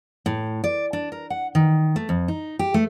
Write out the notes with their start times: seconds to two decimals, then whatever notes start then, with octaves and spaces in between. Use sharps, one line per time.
0.26 A2
0.64 D5
0.93 D4
1.12 A#4
1.30 F#5
1.55 D#3
1.96 A3
2.09 F2
2.28 D#4
2.59 G4
2.74 A3